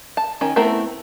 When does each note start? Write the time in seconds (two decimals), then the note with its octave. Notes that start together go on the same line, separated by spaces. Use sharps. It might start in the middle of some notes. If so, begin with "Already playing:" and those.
0.17 A5
0.41 D#3 C#4
0.56 A3 B3 C4 E4 A#4